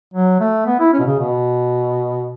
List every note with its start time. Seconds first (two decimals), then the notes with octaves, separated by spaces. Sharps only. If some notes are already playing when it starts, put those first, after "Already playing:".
0.14 F#3
0.40 A3
0.67 B3
0.80 E4
0.93 C#4
1.00 B2
1.06 C#3
1.20 B2